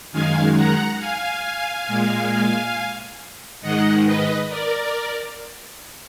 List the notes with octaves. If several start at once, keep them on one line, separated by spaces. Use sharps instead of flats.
F#2 D#3 G#3 F5 G#5
F#5 A#5
F5 G#5
A#2 G#3
G#2 D#3 G#3 D#5 F#5
B4 D#5
A#4 D5